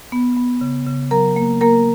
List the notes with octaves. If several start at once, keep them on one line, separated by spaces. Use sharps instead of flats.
B3
B3
C#3
C#3
F#3 A#4 A#5
A#3
A#3 A#4 A#5